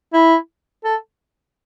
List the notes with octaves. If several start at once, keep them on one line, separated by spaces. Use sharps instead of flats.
E4
A4